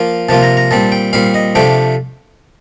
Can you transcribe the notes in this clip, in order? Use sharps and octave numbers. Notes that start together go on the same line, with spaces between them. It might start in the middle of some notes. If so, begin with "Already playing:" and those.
Already playing: F3 A#3 F4
C3 F3 A#3 F4 A5
A#5
A#5
A#2 G3 C4 A5
G5
A#2 G3 C4 F5
D#5
C3 F3 A3 D4 G5